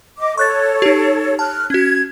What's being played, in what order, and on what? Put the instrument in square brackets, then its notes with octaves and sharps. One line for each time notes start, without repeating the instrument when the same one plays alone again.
[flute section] D#5 D6
[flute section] A4 C#5 [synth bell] C#6 F#6 A6
[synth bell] D#4 G4
[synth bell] A5 [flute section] F6 F#6
[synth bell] C#4 F#4 [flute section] G#6